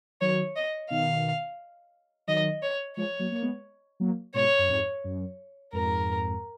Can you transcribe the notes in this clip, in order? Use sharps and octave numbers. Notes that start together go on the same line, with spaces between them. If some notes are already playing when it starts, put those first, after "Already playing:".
D#3 F#3 C#5
D#5
B2 D#3 F5
D#3 F#3 D#5
C#5
F3 G#3 C#5
F#3 A#3
A#3
G#3 B3
F#3 A#3
G#2 B2 C#5
F#2
F2 G#2
F#2
F2 G#2 A#4